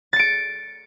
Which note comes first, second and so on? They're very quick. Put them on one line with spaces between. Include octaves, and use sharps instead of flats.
A6 C#7 D7